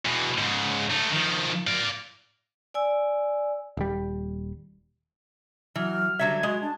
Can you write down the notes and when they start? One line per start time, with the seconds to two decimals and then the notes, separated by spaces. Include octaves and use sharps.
0.05 E2 B2
0.39 G#2 C#3
0.90 A3 D#4
1.12 D#3 F3
1.67 D5 F5
2.74 D5 G#5 E6
3.77 D#1 G3
5.75 E3 F#3 F6
6.19 D3 F#3 G3 E5 G#6
6.43 G#3 F#4
6.62 D4 A5